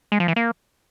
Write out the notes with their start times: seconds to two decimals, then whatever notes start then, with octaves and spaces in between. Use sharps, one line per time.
0.12 G#3
0.20 F3
0.28 E3
0.36 A#3